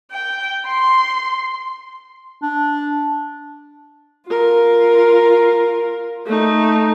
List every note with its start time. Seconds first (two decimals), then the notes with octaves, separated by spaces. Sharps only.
0.12 G5
0.66 C6
2.42 D4
4.27 F4 A#4
6.26 A3 D#4